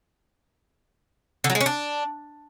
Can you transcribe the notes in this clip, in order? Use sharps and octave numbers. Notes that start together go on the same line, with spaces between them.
D3
F#3
G#3
C#4
D4